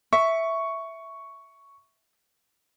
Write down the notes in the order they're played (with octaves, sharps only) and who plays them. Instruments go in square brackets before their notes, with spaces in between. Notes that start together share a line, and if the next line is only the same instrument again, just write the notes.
[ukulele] E5 [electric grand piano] C#6